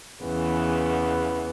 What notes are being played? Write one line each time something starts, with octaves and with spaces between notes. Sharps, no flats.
E2 C#3 E3 B3